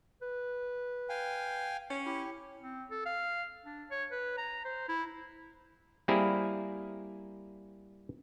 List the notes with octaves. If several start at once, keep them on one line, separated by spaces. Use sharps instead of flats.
B4
F5 G5 G#5
C#4
E4 G4
C4
A4
F5
D4
C#5
B4
A#5
C5
E4
G3 A#3 C4 E4 G#4 A#4